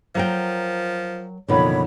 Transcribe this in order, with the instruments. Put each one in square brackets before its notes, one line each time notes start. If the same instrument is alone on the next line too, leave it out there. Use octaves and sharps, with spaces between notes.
[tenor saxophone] F3 [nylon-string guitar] F#3 A#4 G5
[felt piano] F#1 D#3 F3 [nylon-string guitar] B2 D3 [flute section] C#5 B5